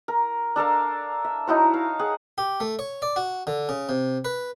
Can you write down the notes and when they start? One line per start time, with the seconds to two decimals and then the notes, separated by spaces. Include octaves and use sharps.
0.08 A#4
0.56 D4 A4 A#4 F5
1.24 E5
1.47 D#4 E4 F#4 C#5
1.74 F5
1.99 G#4 F#5
2.38 G4
2.60 A3
2.79 C#5
3.02 D5
3.16 F#4
3.47 D3
3.69 C#3
3.89 C3
4.25 B4